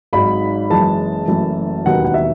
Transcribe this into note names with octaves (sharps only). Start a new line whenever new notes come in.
G#1 G#2 F#3 B5
F#1 F#2 E3 G#3 A5
F#1 F#2 E3 A3
E1 D#2 D#3 F#3 B3 F#5
F#5
E5